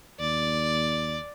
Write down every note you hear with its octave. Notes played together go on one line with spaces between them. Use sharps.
D#2 D5